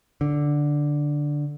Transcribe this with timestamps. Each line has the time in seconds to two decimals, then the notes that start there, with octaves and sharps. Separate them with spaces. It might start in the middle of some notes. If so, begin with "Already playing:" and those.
0.21 D3